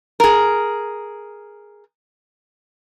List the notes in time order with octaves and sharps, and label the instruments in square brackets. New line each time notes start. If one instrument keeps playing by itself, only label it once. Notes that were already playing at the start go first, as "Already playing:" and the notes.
[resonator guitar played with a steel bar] G#4 A#4